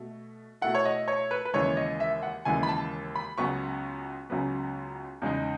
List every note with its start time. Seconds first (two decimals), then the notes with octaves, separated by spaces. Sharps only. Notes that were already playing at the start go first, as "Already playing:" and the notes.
Already playing: B2 A3
0.61 B2 A3 E4 F#5
0.75 C#5
0.85 D#5
1.08 C#5
1.31 B4
1.45 B4
1.54 D#2 C#3 E3 G#3 C#5
1.77 D#5
2.00 E5
2.23 F#5
2.45 D#2 C#3 E3 G#3 G#5
2.63 B5
2.69 A5
3.15 B5
3.38 C#2 C#3 F#3 B3 C#6
4.30 C#2 C#3 F#3 B3
5.22 E2 C#3 G#3 D#4